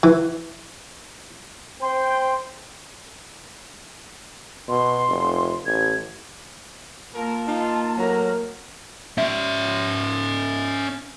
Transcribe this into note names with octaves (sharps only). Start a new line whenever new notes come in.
E3
C4 C5 G5 C6
B2 C6
F1
A1 G#6
A#3 F4 A#4 A5
D#4 F4
A2 F#3 A#4 A#5
C#4 E5